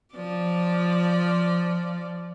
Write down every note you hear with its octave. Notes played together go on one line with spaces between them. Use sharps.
F3 D5